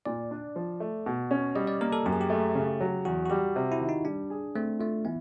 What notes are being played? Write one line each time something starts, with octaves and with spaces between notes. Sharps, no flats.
A#2 D5
D4
F3
A3
B2
C#4
G3 D#5
D5
A#3 A#4
A4
F#2 G4
G#4
G4
A3
C#3
F#3
E2 F#4
F#4
G3 G4
C3
E4
D#3
D#4
G3 D4
G#4
A3 C4
A3 F4
E3 B3